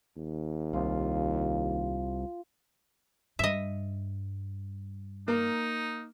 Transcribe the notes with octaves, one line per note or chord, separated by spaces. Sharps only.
D#2
C2 F4
G2 D#5 E5
A#3 D#4